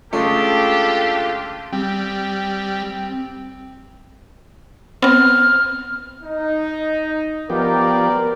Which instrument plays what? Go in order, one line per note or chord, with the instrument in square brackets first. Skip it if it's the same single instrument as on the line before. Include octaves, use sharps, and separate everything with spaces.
[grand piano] C#3 G#3 A3 [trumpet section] D4 G4 A4 [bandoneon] F4
[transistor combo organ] G3 [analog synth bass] C4
[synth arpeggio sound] B3 C4 [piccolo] F6
[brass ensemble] D#4
[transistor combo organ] F3 B3 G4 [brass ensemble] A#4 D5